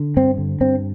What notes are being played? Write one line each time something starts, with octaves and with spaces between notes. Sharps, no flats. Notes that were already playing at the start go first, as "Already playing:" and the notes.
Already playing: D3
G2 C4
D3
G2 C4